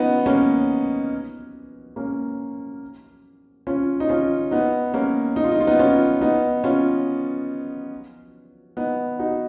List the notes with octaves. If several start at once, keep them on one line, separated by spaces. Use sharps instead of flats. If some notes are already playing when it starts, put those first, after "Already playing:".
Already playing: B3 C#4 D#4 F4
A#3 C#4
A#3 C#4
C#4 F4
D#4
C#4 F4
B3 D#4
A#3 C#4
D#4
F4
D#4
F4
B3 D#4
C#4 F4
B3 D#4
C#4 F4
B3 D#4
D#4 F#4